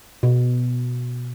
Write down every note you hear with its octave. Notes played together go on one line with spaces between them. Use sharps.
B2